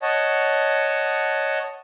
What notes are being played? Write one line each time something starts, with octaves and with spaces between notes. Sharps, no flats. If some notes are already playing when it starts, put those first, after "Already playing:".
C#5 D#5 F#5 A5